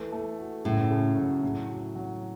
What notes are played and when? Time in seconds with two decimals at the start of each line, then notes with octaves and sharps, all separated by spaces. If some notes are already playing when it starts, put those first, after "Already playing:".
Already playing: E3 A3
0.12 A3
0.39 F#4
0.65 A2 C#3
0.91 C#3
1.17 F#3
1.43 A2
1.69 F#4
1.95 F#3